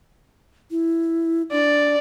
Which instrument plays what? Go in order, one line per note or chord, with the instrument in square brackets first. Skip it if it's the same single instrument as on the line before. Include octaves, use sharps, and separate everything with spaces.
[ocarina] E4
[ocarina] D4 [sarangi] D5